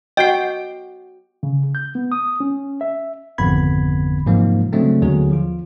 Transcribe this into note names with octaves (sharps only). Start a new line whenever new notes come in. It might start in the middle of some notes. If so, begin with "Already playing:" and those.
F#4 D#5 G5 C7
C#3
G6
B3
D#6
C#4
E5
G#1 F2 D3 B3 B5 G#6
G#2 C3 F3 F#3 A#3
C#3 F#3 G#3 A3 C4 D4
D#2 D3 F#3 B3 G#4
F3 F4